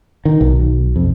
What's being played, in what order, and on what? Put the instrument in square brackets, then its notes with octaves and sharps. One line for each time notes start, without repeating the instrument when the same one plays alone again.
[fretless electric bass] D#3
B1
F2